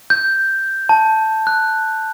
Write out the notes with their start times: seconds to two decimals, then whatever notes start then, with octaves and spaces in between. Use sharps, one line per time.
0.10 G6
0.89 A5
1.47 F#6